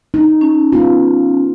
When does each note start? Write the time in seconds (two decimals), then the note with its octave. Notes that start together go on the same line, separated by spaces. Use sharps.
0.14 D#4
0.41 C#4
0.72 B3 F4